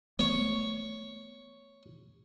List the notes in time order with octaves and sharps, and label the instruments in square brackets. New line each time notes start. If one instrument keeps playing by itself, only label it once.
[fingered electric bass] A3 B3 [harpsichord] C#5